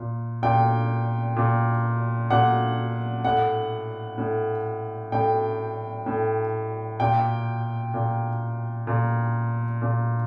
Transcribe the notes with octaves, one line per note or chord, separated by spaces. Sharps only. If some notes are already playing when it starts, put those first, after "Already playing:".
Already playing: A#2
A#2 G5
A#2
A#2 F#5
A2 F#5
A2
A2 G5
A2
A#2 G5
A#2
A#2
A#2